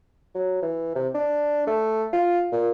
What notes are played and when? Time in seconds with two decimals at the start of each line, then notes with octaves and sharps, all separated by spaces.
0.35 F#3
0.62 E3
0.95 C3
1.15 D4
1.67 A3
2.13 F4
2.52 A#2